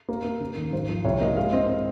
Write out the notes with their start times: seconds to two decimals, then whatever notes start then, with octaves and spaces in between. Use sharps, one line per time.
0.09 A#3 A#4
0.24 A#3
0.41 C#3
0.57 D#2
0.73 G#1 C5
0.89 F3
1.05 C2 C#5
1.21 A#3 D#5
1.37 G#3 F5
1.53 C4 D#5